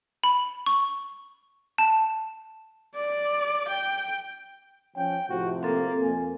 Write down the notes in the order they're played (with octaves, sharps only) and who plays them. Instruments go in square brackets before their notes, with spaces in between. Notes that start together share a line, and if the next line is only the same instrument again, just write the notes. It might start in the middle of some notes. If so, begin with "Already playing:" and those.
[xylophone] B5
C#6
A5
[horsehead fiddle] D5
G5
[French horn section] F3 C#4 [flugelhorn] G5
[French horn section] A2 C3 F3 [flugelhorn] F#4
[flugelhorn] A#3 [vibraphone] C4 A4
[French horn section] F2 A#3 [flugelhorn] G#5